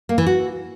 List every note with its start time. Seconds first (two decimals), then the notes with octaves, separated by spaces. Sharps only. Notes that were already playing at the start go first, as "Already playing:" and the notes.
0.09 A#3
0.18 E3
0.26 F#4